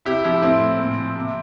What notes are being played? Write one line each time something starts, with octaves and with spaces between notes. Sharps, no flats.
C3 E4 G4
F3 E4 G4
A2 C4 E4
A2
A#2
F3
C3